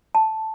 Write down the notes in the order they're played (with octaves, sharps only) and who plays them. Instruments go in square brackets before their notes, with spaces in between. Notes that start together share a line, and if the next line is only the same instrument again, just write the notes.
[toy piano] A5